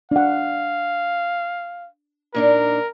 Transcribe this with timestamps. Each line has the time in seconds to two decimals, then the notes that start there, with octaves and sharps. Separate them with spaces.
0.11 D4 F5 F#5
2.34 A#2 D4 D#4 A#4